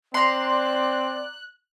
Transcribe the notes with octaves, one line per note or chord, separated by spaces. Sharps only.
C4 D5 A#5 C6 F#6